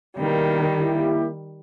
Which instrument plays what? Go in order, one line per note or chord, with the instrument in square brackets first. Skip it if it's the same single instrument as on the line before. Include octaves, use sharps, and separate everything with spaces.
[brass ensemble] B2 A#3 E4 A#4 [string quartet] D#3 G3
[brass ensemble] A#3 E4 G4